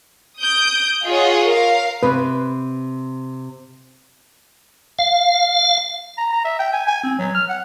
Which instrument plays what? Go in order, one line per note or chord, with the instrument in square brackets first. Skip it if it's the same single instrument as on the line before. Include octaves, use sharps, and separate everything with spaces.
[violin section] D#6 G6 D7
F4 G#4 C#5 D#5 F#5
A#4 F5
[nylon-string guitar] C3 [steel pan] B4
[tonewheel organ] F5
[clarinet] A#5
A#5
E5
G5
G#5
G#5
C4
F#3
F6
F#5